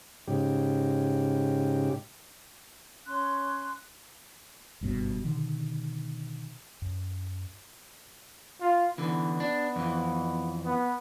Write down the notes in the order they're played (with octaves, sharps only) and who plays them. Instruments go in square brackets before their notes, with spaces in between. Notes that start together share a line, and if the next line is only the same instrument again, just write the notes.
[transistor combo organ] G#2 C#3 G4
[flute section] C#4 C6 F#6
[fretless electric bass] F#1 G2 B2
B2 D3 D#3
F#2
[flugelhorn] F4
[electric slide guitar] D3 E3 [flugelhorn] B3
[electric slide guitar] D4
F2 E3
[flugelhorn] B3